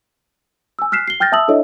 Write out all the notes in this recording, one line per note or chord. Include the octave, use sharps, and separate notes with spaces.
G#5 E6
F6 F#6 B6 C7 E7
C7 G7
G5 F6 G6 A6 A#6
E5 A5 D#6 E6 F#7
D4 E4 A4 C#5 D#5 E5